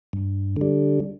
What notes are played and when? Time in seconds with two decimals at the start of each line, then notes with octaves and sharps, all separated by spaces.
0.13 G2
0.56 D3 G3